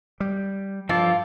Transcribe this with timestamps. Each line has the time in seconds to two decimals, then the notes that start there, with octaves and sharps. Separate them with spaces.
0.20 G3
0.89 G2 F3 F4 A4 D5